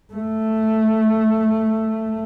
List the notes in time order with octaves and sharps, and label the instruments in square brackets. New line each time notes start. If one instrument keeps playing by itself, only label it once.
[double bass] A3